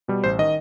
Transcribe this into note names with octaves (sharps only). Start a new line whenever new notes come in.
B2 G3
A1 C5
D#3 D#5